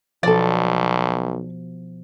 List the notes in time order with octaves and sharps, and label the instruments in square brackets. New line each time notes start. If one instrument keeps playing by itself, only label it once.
[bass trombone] B1 [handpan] B2 F3 [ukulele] A4 D5